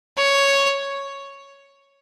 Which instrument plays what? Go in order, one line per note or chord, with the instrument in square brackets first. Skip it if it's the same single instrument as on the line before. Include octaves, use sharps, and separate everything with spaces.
[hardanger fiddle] C#5